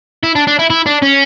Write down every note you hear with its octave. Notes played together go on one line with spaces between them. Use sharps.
E4
D4
D4
E4
E4
D4
C#4